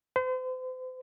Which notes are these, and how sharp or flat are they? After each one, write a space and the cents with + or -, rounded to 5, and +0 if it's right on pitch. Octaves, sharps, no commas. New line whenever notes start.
C5 -40